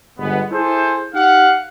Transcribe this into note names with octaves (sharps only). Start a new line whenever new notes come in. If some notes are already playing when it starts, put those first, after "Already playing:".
G1 G#3 B3
E4 G#4 A4 C5
D#4 G4 F5 F#5